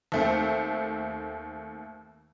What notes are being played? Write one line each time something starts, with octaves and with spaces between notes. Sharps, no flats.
D#2 A3 C4